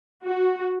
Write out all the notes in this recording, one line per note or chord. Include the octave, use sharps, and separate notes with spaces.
F#4